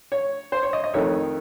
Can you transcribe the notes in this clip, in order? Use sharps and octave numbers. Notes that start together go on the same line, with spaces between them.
C#5
C5
C#5
D#5
D#5
F2 D#3 A3 D#4 C#5